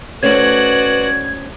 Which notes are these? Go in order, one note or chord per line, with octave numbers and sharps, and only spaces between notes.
A3 C#4 F#4 B4 C5 D5 G#6